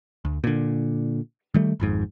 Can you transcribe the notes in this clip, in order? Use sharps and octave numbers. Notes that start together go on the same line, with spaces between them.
D2
A#2 D3
D#3 G3 A3
G#1 F2 G#2